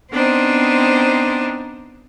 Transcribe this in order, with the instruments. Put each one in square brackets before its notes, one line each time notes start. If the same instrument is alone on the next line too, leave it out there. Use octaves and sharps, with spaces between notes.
[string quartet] B3 C4 D4 D#4 C5